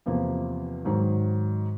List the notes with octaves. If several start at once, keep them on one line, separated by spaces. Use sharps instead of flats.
E2 C3 F3 A#3
G#2 D#3 F#3